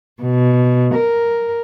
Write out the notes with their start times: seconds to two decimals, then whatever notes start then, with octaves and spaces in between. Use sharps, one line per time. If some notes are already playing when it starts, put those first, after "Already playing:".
0.21 B2
0.93 A#4